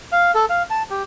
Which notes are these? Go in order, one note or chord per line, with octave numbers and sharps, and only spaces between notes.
F5
A4
F5
A5
G4